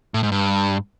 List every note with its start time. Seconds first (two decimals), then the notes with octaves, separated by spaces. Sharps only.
0.14 A2
0.23 G#2
0.32 G2